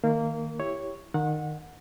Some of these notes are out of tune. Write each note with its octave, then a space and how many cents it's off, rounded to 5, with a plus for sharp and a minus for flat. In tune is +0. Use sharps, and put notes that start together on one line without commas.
D#3 +0 A#3 -20 A#4 +0
E4 +0 G4 +0 C#5 +0
D#3 -20 F#5 -25